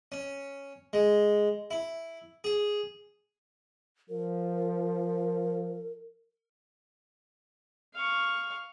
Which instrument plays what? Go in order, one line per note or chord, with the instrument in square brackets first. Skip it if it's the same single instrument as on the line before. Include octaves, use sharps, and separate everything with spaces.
[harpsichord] C#4
G#3
E4
G#4
[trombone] F3 [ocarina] A#4
[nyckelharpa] F5 C#6